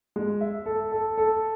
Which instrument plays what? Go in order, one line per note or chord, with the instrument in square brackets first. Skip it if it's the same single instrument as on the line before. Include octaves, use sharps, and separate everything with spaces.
[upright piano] G#3
E5
A4
A4
A4